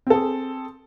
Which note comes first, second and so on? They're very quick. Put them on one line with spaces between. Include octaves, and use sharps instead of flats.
C4 A4 G#4